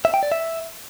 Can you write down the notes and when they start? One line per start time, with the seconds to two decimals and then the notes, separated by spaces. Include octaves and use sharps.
0.05 E5
0.14 G5
0.23 D5
0.32 E5